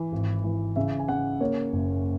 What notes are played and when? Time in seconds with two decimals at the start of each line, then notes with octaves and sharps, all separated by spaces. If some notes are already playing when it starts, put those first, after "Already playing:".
Already playing: E3
0.12 G#1
0.44 E3
0.76 C#3 E5
0.99 G#5
1.08 C#3 F#5
1.40 A#3 C#5
1.73 F#1